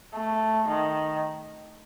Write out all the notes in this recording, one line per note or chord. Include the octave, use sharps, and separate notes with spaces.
A3
D#3